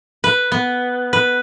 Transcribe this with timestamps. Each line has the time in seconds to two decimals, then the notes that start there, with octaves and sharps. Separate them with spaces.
0.24 B4
0.52 B3
1.13 B4